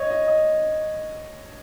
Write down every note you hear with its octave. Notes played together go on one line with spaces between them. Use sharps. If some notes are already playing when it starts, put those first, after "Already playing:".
Already playing: C#5 D#5
D#5
D#5